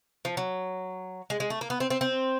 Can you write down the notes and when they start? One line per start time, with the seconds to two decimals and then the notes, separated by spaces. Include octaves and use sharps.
0.25 F3
0.37 F#3
1.30 G#3
1.40 G#3
1.50 A3
1.61 A#3
1.70 B3
1.80 C4
1.90 C4
2.01 C4